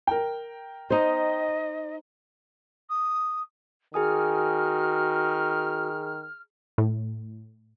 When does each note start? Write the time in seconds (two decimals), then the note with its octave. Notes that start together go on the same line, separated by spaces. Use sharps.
0.07 A#4 G5
0.90 D#4 C5 D#5
2.90 D#6
3.94 D#3 F#4 G#4 G#5 D#6 F6
6.78 A2